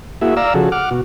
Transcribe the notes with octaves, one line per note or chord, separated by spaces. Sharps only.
A#3 E4 F#4 G#4 E5
D5 F5 A#5 E6
C#3 F3 F#4 G#4 A4
F#5 D6 F6
B2 F#4